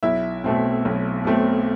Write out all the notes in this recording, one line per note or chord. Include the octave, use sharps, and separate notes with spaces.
B1 E4 E5
B2 A3 C4
B1
B2 A3 C4